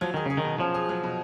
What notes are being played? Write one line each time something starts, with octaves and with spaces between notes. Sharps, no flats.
F3 F#3
D#3 G#4
C#3 G#4
D#3
B2
F3 C#4
G#4
F#3
B2